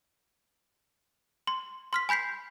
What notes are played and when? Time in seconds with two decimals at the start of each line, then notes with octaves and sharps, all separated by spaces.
1.47 C6
1.93 C6 F6 B6
2.09 G#5 B5 G6 B6 C7